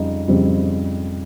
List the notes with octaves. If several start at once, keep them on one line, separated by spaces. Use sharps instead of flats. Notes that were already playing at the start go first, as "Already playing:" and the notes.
Already playing: F2 C#3 G3 D#4
F2 C#3 G3 C4